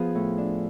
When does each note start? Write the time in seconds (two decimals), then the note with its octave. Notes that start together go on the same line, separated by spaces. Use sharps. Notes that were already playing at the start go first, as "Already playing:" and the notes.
Already playing: F3 B3 F4 G#4 F5
0.15 A2
0.38 D4